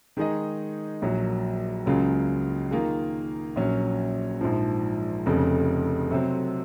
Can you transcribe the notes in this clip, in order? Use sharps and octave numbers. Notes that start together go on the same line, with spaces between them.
D#3 G#3 D#4 G#4 D#5
A#1 A#2 F#3
C#2 C#3 F#3 A#3 F4
D#3 A#3 F4 G#4
A#1 A#2 F#3 C#4
A#1 G#2 F3
F1 F2 C#3
C3 F#3 C4